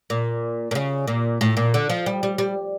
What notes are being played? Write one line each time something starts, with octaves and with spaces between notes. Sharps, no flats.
A#2
A#2
C#3
A#2
A2
A#2
D3
F3
G3
G3
G3